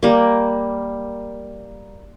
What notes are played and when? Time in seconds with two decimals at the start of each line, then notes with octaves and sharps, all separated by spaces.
0.03 G3 A#3